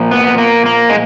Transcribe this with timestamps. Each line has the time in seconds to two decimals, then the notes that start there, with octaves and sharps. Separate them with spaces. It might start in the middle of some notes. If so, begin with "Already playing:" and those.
Already playing: A#2 F3
0.11 B3
0.38 A#3
0.66 A#3
0.90 G#3